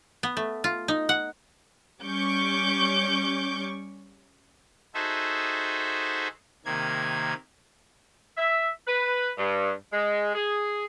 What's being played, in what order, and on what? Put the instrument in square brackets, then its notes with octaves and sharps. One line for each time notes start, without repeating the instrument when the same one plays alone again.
[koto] B3
A3
F4
D#4
F#5
[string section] G3 C#4 C#6 D6 G6
[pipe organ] D#4 F#4 G#4 A4 C5 E5
C3 D#3 A#3 G#6
[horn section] E5
B4
G2
G#3
G#4